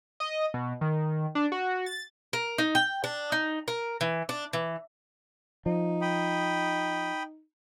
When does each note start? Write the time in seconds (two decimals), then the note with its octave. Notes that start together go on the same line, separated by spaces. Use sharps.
0.20 D#5
0.54 B2
0.81 D#3
1.35 D4
1.52 F#4
1.86 A6
2.33 A#4
2.58 D#4
2.75 G5
3.04 D4
3.32 D#4
3.68 A#4
4.01 E3
4.29 D4
4.53 E3
5.66 F3 D#4
6.01 G5 B5 D#6